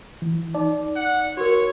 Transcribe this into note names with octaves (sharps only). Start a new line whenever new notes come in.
E3
D#4 D5
F#5
F#4 A#4 C#5